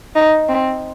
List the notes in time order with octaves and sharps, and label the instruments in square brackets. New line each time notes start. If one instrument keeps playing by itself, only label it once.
[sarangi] D#4
C4